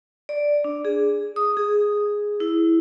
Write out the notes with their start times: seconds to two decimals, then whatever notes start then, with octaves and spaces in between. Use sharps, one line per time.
0.29 D5
0.64 D4
0.85 G#4
1.36 D#6
1.57 G#4
2.40 E4